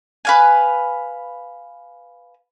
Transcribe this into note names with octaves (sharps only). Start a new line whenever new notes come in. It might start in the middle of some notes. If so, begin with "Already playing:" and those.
B4 F5 G#5